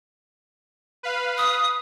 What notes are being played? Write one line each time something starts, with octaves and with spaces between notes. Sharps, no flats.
B4 F5
D#6